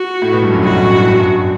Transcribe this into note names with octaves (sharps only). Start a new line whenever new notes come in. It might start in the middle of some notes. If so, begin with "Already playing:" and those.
Already playing: F#4
A2 A3
B2 B3
G2 G3
F#2 F#3
B1 B2 F#4
A1 A2
A2
G2
F#2
G1 G2